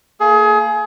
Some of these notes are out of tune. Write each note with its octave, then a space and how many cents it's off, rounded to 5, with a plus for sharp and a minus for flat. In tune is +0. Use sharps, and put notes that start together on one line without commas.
A#3 -25 G#4 +30